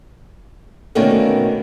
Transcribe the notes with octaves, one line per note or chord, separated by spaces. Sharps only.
B2 D3 D#3 A3 A#3 C#4